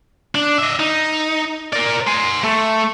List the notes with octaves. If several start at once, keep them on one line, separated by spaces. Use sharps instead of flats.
D4
D#5 E5
D#4
A#4 D5
C5 G#5
A3